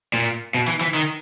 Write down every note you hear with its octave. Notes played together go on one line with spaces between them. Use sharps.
A#2
B2
E3
E3
D#3